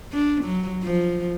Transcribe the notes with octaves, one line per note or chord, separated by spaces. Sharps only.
D4
F#3
F3